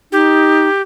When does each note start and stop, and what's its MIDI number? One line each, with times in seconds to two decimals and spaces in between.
0.12 0.68 63
0.12 0.82 67